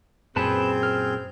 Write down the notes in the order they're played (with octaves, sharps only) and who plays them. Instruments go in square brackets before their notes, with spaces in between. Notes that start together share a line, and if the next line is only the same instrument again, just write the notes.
[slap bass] F#2 A#2 [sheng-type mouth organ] C4 G#4 G6 [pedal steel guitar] B4 A5 B5
[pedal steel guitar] F6